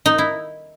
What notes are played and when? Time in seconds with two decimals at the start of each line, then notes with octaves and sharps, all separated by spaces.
0.06 D#4
0.18 E4